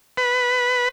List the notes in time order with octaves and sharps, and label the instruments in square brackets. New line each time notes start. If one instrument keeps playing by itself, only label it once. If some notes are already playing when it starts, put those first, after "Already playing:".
[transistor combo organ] B4